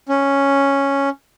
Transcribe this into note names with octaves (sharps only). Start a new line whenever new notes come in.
C#4